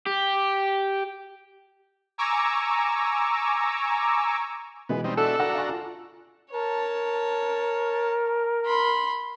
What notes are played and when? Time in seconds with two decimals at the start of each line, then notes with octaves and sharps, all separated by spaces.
0.06 G4
2.18 G#5 A#5 C#6 D6 E6
4.89 B2 E3 G#3 B3
5.04 G3 C4 D#4
5.17 D4 F#4 A4 E5
5.40 D4 F#4 F#5 A#5 E6
5.55 F5 G#5 C#6
5.69 F4
6.53 A#4 C#5 A5
8.66 B5 C6